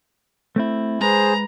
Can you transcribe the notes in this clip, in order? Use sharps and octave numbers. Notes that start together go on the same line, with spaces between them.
A3 C4 E4
G#3 G#4 B4 C5 A#5